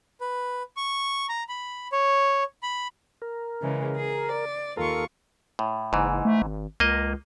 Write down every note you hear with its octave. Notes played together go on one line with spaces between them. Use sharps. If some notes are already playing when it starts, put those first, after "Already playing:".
B4
C#6
A#5
B5
C#5
B5
A#4
C#3 E3 G#3
G#4
D5
D#2 F4 A4 A#4 C#6
A2
F#1 G#2 E3
A3
G#1
C#2 A#3 D#5